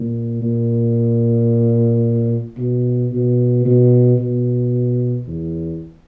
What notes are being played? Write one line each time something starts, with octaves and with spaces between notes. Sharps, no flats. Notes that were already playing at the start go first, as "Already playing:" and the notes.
Already playing: A#2
A#2
B2
B2
B2
B2
E2